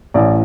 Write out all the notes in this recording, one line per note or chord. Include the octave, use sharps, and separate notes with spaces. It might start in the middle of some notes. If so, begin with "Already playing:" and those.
A1 A2 E3 D5